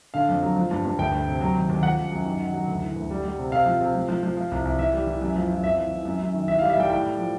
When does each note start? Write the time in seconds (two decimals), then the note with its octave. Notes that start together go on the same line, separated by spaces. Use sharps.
0.14 D3 F5
0.29 F2
0.42 F#3
0.56 F3
0.71 G2
0.85 G2
0.99 D2 G5
1.12 D2
1.27 C3
1.41 F#3
1.56 D#2
1.69 D#2
1.83 F3 F#5
1.98 F#2
2.12 F#2
2.25 D#3
2.39 D#3
2.53 F#3
2.68 D2
2.82 E3
2.96 D2
3.10 G3
3.24 G3
3.38 C3
3.52 C3 F5
3.66 F3
3.80 C3
3.95 F3
4.09 F3
4.23 F3
4.37 F3
4.51 C2
4.65 C2
4.79 E3 E5
4.93 G3
5.07 E3
5.21 F#2
5.36 F3
5.50 F3
5.64 F2 E5
5.78 E3
5.92 E3
6.05 F#2
6.20 F#2
6.34 D#3
6.48 E3 E5
6.59 G3 F5
6.70 E5
6.76 G3 G5
6.90 A2 G5
7.04 A2
7.19 F3